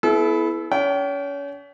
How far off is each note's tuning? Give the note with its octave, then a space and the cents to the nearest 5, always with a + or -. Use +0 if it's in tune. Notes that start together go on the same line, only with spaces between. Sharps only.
B3 +0 E4 +0 A4 -45
C#4 +35 G5 -30